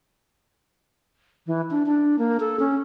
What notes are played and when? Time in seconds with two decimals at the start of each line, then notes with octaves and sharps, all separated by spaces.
1.47 E3
1.71 D4
1.86 D4
2.19 A#3
2.40 A4
2.59 C#4